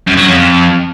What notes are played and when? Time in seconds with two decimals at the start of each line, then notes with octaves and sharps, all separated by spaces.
0.07 F#2
0.17 F#3
0.27 F2